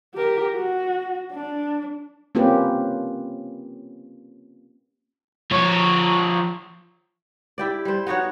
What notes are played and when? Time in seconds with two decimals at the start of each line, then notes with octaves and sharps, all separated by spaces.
0.14 G4 A#4
0.55 F#4
1.33 D4
2.35 A#3 C4 C#4 F4 G4 B4
5.52 F3 C#5
7.58 E4 G4 D5
7.85 G3 C5
8.07 B3 D#4 F#4 C#5